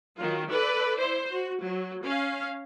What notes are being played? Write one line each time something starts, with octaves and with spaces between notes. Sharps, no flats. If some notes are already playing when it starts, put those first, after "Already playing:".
D#3 F#3 F4
A4 B4 D5
E4 C5
F#4
F#3
C#4 F5